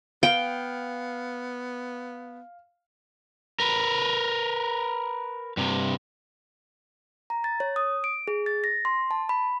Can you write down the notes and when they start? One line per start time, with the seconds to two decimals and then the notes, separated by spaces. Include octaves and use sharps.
0.23 B3 F5 G5
3.60 A#4 B4
5.57 G2 C3
7.30 A#5
7.44 A6
7.60 C#5
7.76 D#6
8.04 D7
8.28 G#4
8.46 A6
8.64 A#6
8.85 C6
9.11 A5
9.29 B5